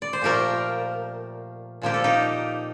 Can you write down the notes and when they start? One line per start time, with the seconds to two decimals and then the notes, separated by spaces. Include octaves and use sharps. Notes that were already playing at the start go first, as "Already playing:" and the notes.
0.02 D5
0.13 C5
0.22 A#2 F3 A3 G4 A#4
1.82 A#2 F3 A#3 G4
1.94 A4
2.04 D#4 G4